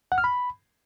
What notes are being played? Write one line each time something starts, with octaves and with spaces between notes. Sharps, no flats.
F#5
F6
B5